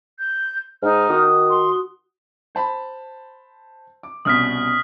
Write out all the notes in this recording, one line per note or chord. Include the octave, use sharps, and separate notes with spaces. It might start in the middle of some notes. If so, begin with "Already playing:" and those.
G6
G#2 D#4 F6
D#3 F#4 D#6
C6
C5 A5 B5
D6
C2 B2 C#4 D#6 F6 B6